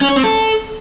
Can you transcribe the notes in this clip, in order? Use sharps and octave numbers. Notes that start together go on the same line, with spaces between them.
C#4
C#5
C4
A4